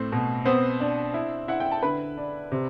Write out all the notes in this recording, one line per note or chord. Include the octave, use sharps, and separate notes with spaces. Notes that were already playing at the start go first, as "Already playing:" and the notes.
Already playing: A2 C4
B2
B3 C4 C5
D4
E4
E4 F#5
G5
A5
D3 B4 B5
D4
C3